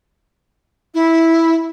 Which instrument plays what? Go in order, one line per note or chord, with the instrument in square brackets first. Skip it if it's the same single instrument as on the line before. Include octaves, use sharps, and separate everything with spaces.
[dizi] E4